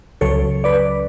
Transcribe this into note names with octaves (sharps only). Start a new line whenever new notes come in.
C#2 C#3 F#3 A4 C#5
B4 D5